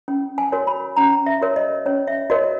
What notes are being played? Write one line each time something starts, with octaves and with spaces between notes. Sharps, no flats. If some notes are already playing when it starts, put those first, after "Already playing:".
C#4
G#5
F#4 A#4 C#5
B5
C#4 A#5
E5
F#4 A#4 C#5
D#5
C#4 C#5
E5
F#4 A#4 C#5 D#5